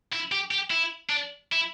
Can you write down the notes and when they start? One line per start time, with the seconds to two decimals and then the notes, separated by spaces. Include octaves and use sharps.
0.13 E4
0.32 G4
0.51 G4
0.70 E4
1.09 D4
1.52 E4